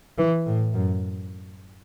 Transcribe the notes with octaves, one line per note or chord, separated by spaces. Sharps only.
E3
A2
F#2